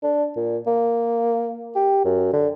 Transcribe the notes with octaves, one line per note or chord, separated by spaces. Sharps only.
D4
A#2
A#3
G4
F#2
D3